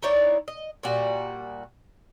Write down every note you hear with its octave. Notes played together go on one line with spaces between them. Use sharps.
D#4 E4 C#5 D5
D#5
A#2 G3 F#4